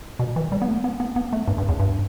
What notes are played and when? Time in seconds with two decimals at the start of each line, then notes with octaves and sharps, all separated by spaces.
0.19 B2
0.36 E3
0.52 G3
0.62 B3
0.68 A3
0.84 B3
1.00 B3
1.16 B3
1.33 A3
1.48 G2
1.58 G2
1.69 E2
1.80 G2